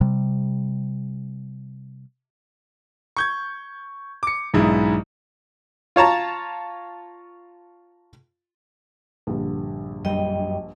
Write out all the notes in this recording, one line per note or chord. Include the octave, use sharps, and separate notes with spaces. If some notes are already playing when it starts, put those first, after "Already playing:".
C3 G3
C#6 G6 G#6
D6 C#7
B1 G#2 G#3 D4 E4
F4 C#5 A5 A#5
A#1 G2 D3
F#2 G3 D#5 G5